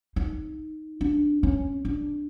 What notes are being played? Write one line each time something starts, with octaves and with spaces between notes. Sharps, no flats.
D#4
D4
C#4
D4